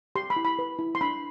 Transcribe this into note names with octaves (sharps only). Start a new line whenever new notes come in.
G4 C6
B5
E4
B5
B4
E4
C6
D4 B5